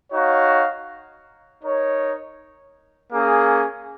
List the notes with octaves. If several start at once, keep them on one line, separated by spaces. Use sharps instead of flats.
D#4 F#4 C#5 F5
D#4 A#4 C#5
A#3 C#4 G#4